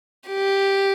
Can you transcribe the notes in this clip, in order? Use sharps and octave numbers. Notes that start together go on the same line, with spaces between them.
G4